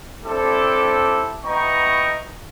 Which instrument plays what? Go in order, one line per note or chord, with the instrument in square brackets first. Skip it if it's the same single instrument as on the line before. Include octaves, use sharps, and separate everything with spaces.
[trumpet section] C4 D4 E4 G4 A4
B3 E4 D#5 G5 A#5 C#6